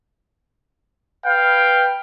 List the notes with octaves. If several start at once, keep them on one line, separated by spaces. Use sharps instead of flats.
B4 F5 G5